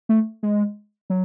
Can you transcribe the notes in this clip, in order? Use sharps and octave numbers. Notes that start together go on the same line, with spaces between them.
A3
G#3
F#3